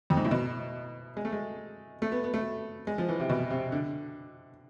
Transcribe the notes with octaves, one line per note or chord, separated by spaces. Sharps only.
F2
G#2
A2
B2
G#3
A3
G#3
A3
B3
B3
A3
G#3
F3
E3
C3
B2
C3
D3